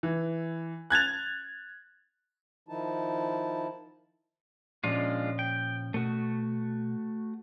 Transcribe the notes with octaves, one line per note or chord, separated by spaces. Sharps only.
E3
F#6 G#6 A6 F7
D#3 F3 D#4 E4 A5
A#2 F3 G#3 C#4 D4 F4
G5
B2 A3 F#4